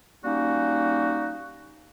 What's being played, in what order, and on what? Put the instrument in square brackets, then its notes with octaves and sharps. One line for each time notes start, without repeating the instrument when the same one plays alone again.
[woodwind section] G3 A#3 C#4 D#4 F#4